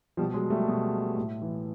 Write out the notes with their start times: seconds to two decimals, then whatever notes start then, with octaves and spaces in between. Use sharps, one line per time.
0.17 B2 F3 G3
0.34 F#3 G#3
0.50 G3 A3
0.68 B2
1.17 A2
1.42 E3